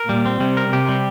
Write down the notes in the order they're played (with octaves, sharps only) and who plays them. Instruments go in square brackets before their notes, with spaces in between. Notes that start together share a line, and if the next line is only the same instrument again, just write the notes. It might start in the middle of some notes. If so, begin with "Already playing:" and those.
Already playing: [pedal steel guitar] A#4
[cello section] A#2 [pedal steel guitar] G3
[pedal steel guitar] C4
[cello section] C3 [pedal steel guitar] G3
[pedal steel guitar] A#4
[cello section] C3 [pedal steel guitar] G4
[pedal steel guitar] G3